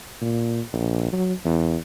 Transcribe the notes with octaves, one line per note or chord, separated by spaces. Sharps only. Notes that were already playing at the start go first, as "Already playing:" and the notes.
A#2
A#1
F#3
E2